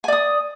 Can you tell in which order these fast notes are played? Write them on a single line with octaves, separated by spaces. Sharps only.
G#5 D5 D#6